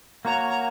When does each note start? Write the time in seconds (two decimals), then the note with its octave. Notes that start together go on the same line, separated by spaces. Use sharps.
0.25 A#3 F#4 C#5 A#5
0.50 A#5